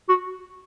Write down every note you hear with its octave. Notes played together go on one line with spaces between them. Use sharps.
F#4